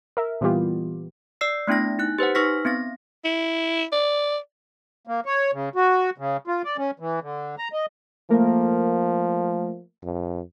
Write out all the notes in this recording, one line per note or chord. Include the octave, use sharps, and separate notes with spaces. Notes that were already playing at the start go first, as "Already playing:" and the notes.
A#4 E5
A#2 E3 G3 B3 F4 G4
D5 E6 C7
A3 B3 D4 E4 A#6
D#4 F#6
G4 B4 C5 F#5
D#4 B4 C#6 F6 A#6 B6
B3 C4 A#6
E4
D5
A#3
C#5
C#3
F#4
C#3
F4
D5
C#4
E3
D3
A#5
D#5
F3 A3 A#3 A#4
F2